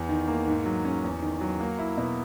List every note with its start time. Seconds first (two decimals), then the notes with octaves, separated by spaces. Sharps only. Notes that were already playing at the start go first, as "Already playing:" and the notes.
Already playing: E2
0.09 D#3
0.28 A#3
0.47 G#2
0.65 F#3
0.85 C#4
1.03 E2
1.22 D#3
1.41 F#3
1.60 A#3
1.79 E4
1.97 B2